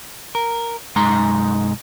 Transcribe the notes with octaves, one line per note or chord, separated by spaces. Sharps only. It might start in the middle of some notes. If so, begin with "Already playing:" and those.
A#4
B1 F#2 G#3 D#4 A#5 C6